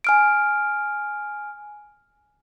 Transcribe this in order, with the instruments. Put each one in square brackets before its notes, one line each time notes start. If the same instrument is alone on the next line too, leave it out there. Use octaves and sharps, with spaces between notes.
[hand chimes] G#5 F6 D7